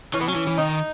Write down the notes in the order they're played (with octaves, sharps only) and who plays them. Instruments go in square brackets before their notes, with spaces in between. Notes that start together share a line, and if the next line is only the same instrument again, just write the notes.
[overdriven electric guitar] E3 [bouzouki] C#4
[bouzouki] B3
[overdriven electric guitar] F#3 [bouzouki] C#4
[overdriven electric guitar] E3
E3
[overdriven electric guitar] D#3 [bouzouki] D#4